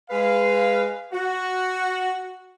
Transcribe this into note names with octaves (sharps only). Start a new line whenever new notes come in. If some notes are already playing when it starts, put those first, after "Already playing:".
G#3 B4 F5
F#4